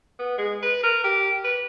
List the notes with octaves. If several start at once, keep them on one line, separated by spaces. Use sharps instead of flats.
B3
G#3
B4
A#4
G4
B4